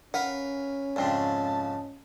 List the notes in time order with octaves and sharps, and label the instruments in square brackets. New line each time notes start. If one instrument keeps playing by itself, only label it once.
[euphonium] C#4 [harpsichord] A#4 B4 F5 [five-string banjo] F#5
[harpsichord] F2 G#2 C#3 [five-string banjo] C4 D4 [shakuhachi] A5